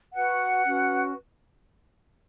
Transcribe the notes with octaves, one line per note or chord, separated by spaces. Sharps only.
F#4 B4 F#5
C#4 F#4 B4